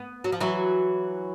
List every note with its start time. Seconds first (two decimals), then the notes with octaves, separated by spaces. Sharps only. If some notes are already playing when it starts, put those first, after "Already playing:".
Already playing: B3
0.24 F#3
0.32 F3
0.40 E3 F#3